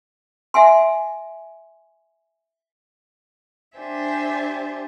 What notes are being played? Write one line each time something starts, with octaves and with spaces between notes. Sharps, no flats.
E5 F#5 G#5 C6
D4 G4 C5 E5 G#5